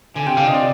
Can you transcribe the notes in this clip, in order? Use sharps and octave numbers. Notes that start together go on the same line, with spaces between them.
D3 G#5
C3 G5
D3 F5
C3 D#5
D5